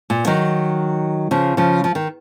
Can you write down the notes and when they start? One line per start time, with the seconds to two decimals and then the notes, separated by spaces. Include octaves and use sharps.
0.10 A#2
0.26 D#3 F#3
1.31 C#3 F3
1.57 C#3 F3
1.84 F3
1.95 D#3